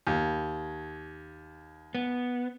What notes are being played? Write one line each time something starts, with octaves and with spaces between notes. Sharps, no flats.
D#2
B3